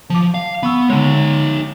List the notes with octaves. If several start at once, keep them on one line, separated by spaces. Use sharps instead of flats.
F3 A5 D6
F5
B3 B5 C#6 E6
D3 G#3 D#4 C#5